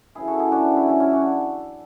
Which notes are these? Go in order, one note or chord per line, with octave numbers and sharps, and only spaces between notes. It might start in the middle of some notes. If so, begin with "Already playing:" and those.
F#2 C#3 E3 E4 G#4
F#4 A4
E4 G#4
F#2 C#3 E3 D4 F#4
C#4 E4
F#2 C#3 E3 C#4 E4
C#4 E4
D4 F#4